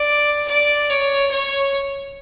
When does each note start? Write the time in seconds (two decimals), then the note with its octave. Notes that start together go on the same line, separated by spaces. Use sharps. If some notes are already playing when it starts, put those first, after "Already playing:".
Already playing: D5
0.48 D5
0.90 C#5
1.31 C#5